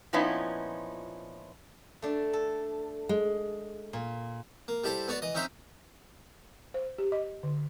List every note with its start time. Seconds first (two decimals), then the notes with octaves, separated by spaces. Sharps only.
0.13 A#2 F3 B3 C#4 D#4 E4
2.02 A3 D4
2.33 A4
3.09 G#3
3.93 A#2
4.68 A#3
4.84 G3 E4 G4 A4 C5
5.08 B3 F#4 C#5 D5
5.22 E3 D#5
5.35 C4 C#4 D#4 C5 E5
6.74 C5
6.99 G4
7.12 D#5
7.43 D3